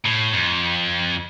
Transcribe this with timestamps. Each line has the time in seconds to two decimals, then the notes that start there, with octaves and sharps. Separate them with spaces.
0.05 A2
0.33 F2